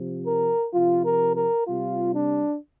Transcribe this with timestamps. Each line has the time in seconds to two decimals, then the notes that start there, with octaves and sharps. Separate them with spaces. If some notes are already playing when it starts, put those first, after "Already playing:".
Already playing: C3 F3
0.25 A#4
0.73 C3 F3 F4
1.04 A#4
1.36 A#4
1.68 C3 G3 F4
2.14 D4